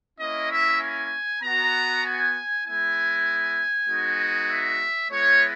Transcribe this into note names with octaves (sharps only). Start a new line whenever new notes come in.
A#3 C#4 E4 D#5
E5
G#5
B3 F#4 A#5
G#5
G#3 B3 E4 G#5
G#3 B3 D#4 F#4
E5
G#3 B3 E4 C#5